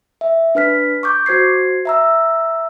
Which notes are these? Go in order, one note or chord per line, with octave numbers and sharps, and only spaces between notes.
E5
D4 B4 F6 B6
C#6 D6 G6
F#4 C5 G#6 C7
E5 A#5 E6